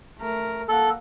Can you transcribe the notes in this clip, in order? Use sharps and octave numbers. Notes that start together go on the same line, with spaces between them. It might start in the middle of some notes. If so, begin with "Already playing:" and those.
A3 A#4
A#3 A4 F#5